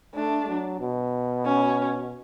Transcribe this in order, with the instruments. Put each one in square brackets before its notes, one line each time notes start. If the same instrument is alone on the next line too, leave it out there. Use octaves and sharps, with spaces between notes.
[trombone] A3 [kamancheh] D4
[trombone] F#3
B2
[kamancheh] C#4